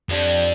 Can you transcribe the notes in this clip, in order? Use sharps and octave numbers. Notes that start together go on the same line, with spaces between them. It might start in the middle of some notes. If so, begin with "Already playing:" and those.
F2 D4 G4 D5 F5